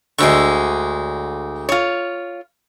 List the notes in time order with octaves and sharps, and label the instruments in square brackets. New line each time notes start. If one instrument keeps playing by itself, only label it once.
[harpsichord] D2 C#6 [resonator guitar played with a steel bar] D3 G#3
[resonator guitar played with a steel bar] F4 C#5